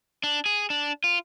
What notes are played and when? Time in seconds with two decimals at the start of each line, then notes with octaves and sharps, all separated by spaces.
0.24 D4
0.46 G#4
0.70 D4
1.04 F4